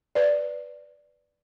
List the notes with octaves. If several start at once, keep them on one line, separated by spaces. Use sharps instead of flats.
B4 D5